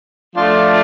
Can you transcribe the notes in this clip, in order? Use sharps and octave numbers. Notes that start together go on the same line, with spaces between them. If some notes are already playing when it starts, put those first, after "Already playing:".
F3 A3 D4 F4